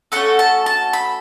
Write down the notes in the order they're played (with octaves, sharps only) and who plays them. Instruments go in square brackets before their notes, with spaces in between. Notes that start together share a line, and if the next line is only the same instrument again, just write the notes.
[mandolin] A3 C#4 F#4 A4 F#5
A5
A5
B5